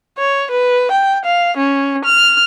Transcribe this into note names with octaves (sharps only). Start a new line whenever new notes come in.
C#5
B4
G5
F5
C#4
F6